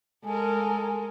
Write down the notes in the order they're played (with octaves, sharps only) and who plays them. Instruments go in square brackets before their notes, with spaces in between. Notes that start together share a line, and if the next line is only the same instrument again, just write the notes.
[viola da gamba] G#3 [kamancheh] A4 A#4 [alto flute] G#5